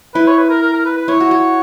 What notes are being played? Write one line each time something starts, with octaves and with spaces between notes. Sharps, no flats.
E4 B4
C#5
B4
A#4
A#4
A#4
B4
B4
E4 C#5
F#4
F#4